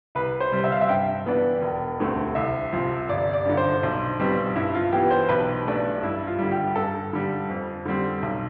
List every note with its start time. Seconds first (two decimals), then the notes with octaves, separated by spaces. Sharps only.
0.15 C2 B4
0.40 C5
0.52 C3 G3
0.64 E5
0.72 F5
0.81 E5
0.89 G2 G5
1.26 E3 B3 D4
1.62 E1
1.99 D2 D3 A3 C4
2.35 C2 E5
2.72 C3 F3 C4
3.09 G1 D5
3.33 D5
3.45 G2 D3
3.57 C5
3.83 B1
4.19 B2 G3 C4
4.55 G2 E4
4.75 F4
4.92 E3 B3 G4
5.11 C5
5.29 B1 B4
5.65 B2 A3 D4
6.03 G2 E4
6.27 F4
6.39 D3 G3
6.51 G4
6.75 G2 A4
7.13 D3 G3
7.49 F2
7.85 D3 G3 C4
8.23 B1